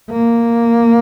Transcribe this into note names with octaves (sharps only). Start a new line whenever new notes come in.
A#3